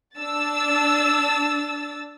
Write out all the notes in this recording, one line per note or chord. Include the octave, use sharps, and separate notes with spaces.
D4 E6 A6